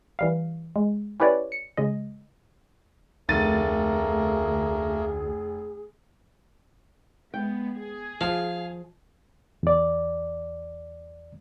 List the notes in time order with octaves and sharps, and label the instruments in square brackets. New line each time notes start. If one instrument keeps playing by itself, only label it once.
[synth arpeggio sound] E3 G3 F5
G#3
C#4 E4 G4 B4 C#5 D5
C#7
C#3 G#3 D#5
[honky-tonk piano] F1 A6 D#7 [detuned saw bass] D2 [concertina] A3 A#3 A#4 [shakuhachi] G#4
[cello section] G#3 B3 [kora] G5
[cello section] G#4
[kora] F3 [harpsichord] F5
[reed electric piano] E2 D5